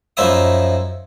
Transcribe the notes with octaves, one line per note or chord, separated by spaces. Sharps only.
F#2 F3 D#4 E4 E5 D#6